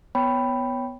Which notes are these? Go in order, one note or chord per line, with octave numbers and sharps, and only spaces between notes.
B3 C#5 G5 B5